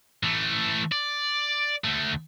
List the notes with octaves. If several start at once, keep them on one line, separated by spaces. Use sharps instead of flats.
E3 A3
D5
D2 A3